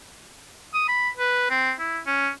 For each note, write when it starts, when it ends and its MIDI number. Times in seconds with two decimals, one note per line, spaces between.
0.74 0.85 87
0.88 1.09 83
1.17 1.47 71
1.50 1.73 60
1.79 1.99 64
2.06 2.30 61